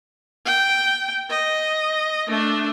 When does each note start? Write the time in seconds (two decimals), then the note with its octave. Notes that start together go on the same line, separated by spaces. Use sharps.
0.46 G5
1.30 D#5
2.27 A3 D4